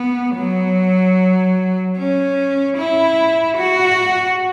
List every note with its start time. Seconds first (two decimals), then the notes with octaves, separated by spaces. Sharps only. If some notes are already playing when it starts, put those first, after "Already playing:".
Already playing: B3
0.37 F#3
1.97 C#4
2.78 E4
3.57 F#4